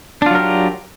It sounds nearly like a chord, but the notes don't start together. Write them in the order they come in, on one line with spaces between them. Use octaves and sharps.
D4 F4 F#3 A#4 G4